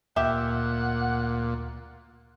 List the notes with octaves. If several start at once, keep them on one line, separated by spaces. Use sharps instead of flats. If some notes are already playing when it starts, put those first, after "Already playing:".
D2 A#2 G4 E5 F#5